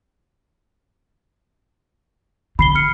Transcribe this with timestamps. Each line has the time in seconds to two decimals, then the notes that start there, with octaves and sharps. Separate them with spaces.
2.59 D3 B5 C7 G7
2.75 F6 C#7